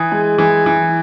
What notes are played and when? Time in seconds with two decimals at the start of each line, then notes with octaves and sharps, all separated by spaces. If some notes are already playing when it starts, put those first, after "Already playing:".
Already playing: E3 D#6
0.12 G#3
0.38 E3
0.66 E3